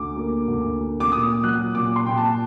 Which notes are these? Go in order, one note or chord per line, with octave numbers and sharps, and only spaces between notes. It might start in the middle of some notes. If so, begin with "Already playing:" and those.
Already playing: D2 D6
A#3
D2
A#3
D6
A#2 D#6
F#3 F#6
A#2 D6
C6
A#2 G5
A5